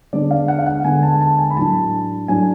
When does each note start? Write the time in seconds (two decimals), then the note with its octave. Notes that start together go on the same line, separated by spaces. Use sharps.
0.13 D3 G#3 B3 D4 D5
0.31 F5
0.48 F#5
0.59 F5
0.66 F#5
0.84 D3 G#3 B3 D4 G#5
1.03 A5
1.21 A5
1.39 G#5
1.51 B5
1.57 A2 F#3 A3 D4 A5
2.28 A2 F#3 A3 D4 G#5